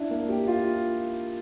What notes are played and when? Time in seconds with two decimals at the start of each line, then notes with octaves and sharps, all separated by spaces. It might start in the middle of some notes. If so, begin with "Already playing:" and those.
Already playing: D4 E4
0.11 A#3
0.29 G4
0.47 F4